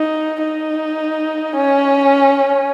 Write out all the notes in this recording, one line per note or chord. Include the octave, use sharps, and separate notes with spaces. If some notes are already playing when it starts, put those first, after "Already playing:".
Already playing: D#4
D#4
C#4